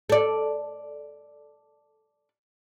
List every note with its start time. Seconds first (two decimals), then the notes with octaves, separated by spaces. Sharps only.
0.09 A4 D5